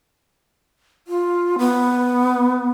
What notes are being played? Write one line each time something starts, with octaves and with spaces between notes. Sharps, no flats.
F4
B3